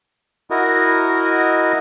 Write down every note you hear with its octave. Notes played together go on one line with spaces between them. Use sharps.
E4 F#4 A#4 D#5